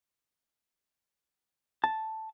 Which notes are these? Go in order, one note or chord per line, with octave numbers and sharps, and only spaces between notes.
A5